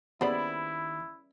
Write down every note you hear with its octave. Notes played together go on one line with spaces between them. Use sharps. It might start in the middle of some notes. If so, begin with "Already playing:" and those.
D#2 C#3 G3 B3 E4 C5 D5 B5